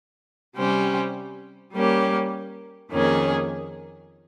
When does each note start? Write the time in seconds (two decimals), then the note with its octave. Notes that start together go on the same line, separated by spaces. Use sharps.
0.56 C3 G3 C#4 G4 C5
1.74 G3 A#3 C#4 G4
2.91 F2 D#3 A#3 C#4 G#4